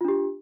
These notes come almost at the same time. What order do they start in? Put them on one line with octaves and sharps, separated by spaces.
F4 D4 G4